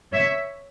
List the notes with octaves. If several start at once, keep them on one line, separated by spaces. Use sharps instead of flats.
C#5 E5